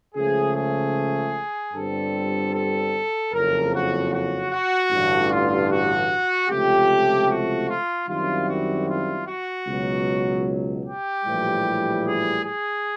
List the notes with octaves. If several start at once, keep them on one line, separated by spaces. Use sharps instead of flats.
C#2 C#3 F3 A3 G#4
G#4
G1 G2 D3 G3 C4 A4
A4
F#1 F2 C#3 A#4
F#4
F#4
F#4
A1 G2 D3
F4
F#4
C#2 C3 F3 A3 G4
F#4
F4
F#2 D#3 G3 C4 E4 F4
F#4
F4
F#4
C#2 B2 F#3
G4
A#1 A2 E3 G3
G#4
G#4